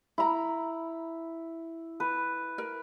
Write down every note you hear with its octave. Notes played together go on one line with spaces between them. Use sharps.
E4 A#5 B5
B4
A#4